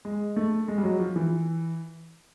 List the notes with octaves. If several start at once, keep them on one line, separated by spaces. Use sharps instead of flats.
G#3
A3
G#3
G3
F#3
F3
E3